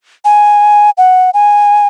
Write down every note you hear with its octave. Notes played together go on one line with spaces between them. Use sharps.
G#5
F#5
G#5